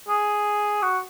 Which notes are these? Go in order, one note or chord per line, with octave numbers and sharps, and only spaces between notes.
G#4
F#4